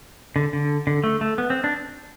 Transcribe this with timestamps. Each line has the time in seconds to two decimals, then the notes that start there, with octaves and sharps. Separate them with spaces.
0.36 D3
0.53 D3
0.87 D3
1.04 A3
1.21 A3
1.38 B3
1.50 C4
1.64 D4